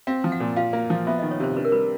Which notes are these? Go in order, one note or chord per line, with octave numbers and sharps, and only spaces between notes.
C4 F5
F3
F#5
A#2
F4 F5
A#3
F3
B3 E5
D#5
D#3
C#5
C3 C5
D4 B4
A#4
G3 B4